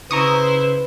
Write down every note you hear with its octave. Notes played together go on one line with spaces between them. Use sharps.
C#3 E4 B4 C5 A#5 C#6 D#6